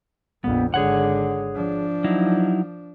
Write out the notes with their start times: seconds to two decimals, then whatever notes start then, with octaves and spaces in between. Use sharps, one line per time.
0.44 A#1 F2 B3
0.74 G#1 D3 G#4 C#5 F#5
1.55 F3 D4
2.04 F#3 D#4 E4